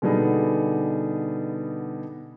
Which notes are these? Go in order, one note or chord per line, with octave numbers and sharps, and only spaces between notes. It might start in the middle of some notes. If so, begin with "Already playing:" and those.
B2 D3 G3 B3 D#4 G#4